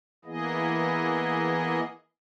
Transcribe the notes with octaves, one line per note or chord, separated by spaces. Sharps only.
E3 A#3 B3 E4 G#4 D#5